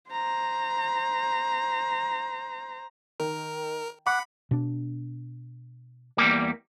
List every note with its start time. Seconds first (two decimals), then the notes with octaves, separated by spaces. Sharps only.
0.10 C5 A#5
3.20 D#3 A#4
4.07 F#5 B5 D6
4.51 B2 D4
6.18 E2 G3 A#3